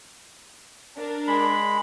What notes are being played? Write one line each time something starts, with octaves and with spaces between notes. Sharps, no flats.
D4 A#4
G#3 B5